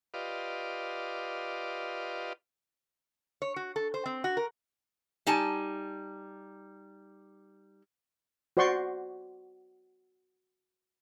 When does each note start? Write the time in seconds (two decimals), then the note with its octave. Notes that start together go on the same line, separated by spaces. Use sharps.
0.14 F4 G4 B4 D5 D#5 F5
3.42 C#5
3.56 F#4
3.76 A4
3.94 C5
4.06 C4
4.24 F#4
4.37 A#4
5.27 G3 D#4 G#5 A5
8.57 F#4 C5 D5 C6 C#6